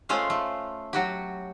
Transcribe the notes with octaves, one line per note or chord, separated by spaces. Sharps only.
G#3 A3 C#4 F4 C5 F5
A3
F#3 F#4 G4